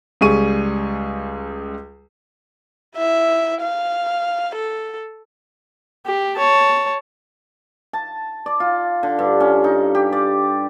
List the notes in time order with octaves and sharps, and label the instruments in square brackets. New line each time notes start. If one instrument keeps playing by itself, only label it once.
[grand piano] C#2 G3 G#4 C#6 D#7
[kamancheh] E4 E5
F5
A4
[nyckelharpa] G4
C#5 A5
[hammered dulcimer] A5
D5
F4
D3
G2
C#4
D#4
G4
D5